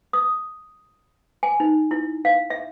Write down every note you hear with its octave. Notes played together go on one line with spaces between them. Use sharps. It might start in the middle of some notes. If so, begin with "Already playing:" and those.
D#6
G#5
D#4
E4
F5
E5